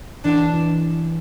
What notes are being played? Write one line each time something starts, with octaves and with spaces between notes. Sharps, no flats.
E3 D4
E3